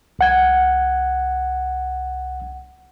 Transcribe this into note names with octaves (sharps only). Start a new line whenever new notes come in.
C2 F#5 G#6